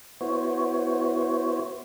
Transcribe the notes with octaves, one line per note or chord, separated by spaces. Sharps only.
B3 E4 F#4 C5 C#5